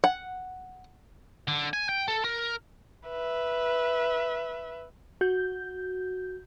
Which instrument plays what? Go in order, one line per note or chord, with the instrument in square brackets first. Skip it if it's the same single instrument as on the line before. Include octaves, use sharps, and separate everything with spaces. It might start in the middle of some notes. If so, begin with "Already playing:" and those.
[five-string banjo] F#5
[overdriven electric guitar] D3
G#5
G5
A4
A#4
[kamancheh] B4 E5
[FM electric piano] F#4 G6